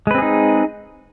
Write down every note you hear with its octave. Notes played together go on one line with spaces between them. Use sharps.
G#3 C4 D#4 G#4 B4